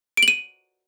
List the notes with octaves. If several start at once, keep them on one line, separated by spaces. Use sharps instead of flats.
D7
F#7
D#7